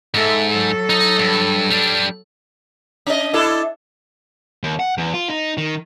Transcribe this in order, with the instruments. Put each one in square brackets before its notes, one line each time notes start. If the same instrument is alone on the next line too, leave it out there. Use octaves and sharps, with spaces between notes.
[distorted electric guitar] G#2 [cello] A4 E5
[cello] F#3 A4
[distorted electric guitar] D#4 D#5
G2
G3 D4
[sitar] C#4 D#5
D4 E4 A4
[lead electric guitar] D#2
F#5
E2
F4
D#4
D#3